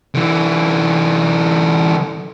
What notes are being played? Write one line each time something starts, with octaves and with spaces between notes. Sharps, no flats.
D3 E3